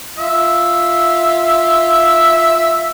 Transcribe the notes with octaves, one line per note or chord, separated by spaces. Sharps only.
F4 E5